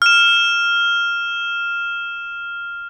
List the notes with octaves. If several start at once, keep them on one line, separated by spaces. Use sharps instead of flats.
F6 E7